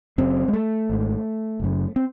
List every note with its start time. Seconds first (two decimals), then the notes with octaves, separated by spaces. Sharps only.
0.18 F#1 F#2 C#3 C4
0.48 G#3
0.53 A3
0.90 G#1 G#2
1.60 F#1 F#2 C#3
1.96 C4